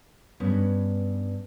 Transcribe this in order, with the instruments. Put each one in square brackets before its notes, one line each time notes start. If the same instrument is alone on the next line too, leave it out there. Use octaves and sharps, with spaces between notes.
[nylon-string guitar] G2 B3 C#4